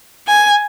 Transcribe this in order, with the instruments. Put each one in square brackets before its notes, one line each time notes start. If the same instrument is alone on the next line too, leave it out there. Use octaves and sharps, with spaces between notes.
[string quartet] G#5